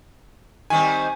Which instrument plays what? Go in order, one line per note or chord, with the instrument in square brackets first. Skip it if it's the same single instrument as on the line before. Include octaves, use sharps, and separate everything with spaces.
[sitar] D#3 G3 C4 [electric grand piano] G#5